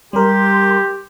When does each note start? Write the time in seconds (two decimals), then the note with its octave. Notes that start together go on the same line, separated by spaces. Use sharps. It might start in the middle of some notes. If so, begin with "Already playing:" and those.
0.13 G3 G4 A#4 C6